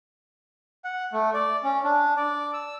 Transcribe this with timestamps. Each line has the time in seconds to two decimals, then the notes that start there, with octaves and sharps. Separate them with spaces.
0.84 F#5
1.13 A3
1.34 D5
1.63 C#4
1.84 D4
2.17 D5
2.54 E6